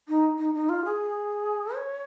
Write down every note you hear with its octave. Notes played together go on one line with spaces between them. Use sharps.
D#4
D#4
D#4
F4
G#4
C#5